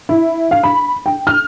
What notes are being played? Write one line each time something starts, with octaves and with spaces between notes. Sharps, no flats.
E4
F5
B5
G5
F6